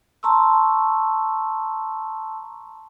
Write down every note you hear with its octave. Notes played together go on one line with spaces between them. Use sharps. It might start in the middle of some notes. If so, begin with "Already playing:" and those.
A5 A#5 C6 C#6 E6